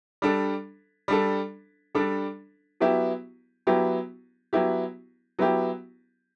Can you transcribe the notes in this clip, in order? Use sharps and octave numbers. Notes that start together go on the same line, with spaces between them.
G3 D4 A4
G3 D4 A4
G3 D4 A4
F#3 B3 E4 G4
F#3 B3 E4 G4
F#3 B3 E4 G4
F#3 B3 E4 G4